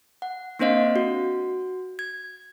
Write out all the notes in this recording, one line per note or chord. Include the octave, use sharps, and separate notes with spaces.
F#5
A#3 C4 D4 C5 D#5 F5
F#4
G#6